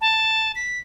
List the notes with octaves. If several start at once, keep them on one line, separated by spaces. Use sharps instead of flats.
A5
B6